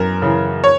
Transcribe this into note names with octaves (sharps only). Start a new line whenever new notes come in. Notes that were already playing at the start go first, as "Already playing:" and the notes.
Already playing: F#2 E3 A#4
C#3 E3
C#5